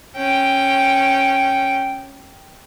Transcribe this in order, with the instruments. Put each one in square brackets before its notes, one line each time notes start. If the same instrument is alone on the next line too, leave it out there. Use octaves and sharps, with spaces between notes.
[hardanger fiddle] C#4 G5